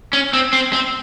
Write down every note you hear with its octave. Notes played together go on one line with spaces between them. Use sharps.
C#4
C4
C4
C4